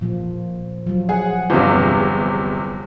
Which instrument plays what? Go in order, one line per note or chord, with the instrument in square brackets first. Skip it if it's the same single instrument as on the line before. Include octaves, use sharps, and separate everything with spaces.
[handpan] A#2 F3
F3 F#3
[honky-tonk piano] G#4 [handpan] F#5
[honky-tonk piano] G1 E2 C3 [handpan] F4